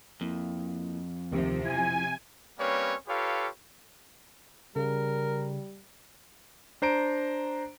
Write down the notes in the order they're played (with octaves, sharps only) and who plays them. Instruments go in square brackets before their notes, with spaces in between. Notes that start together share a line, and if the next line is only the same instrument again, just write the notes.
[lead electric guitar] F2 [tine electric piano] A#3 E4
[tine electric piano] D2 D#3 G4 [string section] C3 F3
[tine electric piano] E4 [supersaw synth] G#5
[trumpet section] G3 A#3 C4 C#4 B4 C#5
F4 G4 A4 B4 C#5 F5
[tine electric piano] C#3 [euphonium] G3 [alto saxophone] A#4
[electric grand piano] D4 C5 A#5 D7